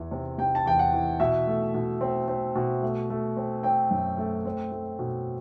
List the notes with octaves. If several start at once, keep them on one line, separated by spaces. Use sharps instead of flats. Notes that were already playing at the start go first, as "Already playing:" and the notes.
Already playing: E2 E3
C3
C3 G5
A5
E2 G5
F#5
E3
B2 E5
A3
B2
C4
C4
B2
A3
A3
C4
C4 G5
F#2
A3
C4
A3
B2